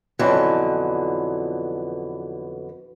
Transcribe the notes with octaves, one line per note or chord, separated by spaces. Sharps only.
F2 B2 D3 E3 F#3